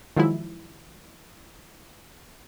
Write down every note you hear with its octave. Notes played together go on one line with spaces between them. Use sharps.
D#3 F3 F#3 G#3 E4